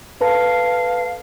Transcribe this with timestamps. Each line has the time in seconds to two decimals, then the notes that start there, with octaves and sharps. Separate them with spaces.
0.21 A4 B4 F5 A5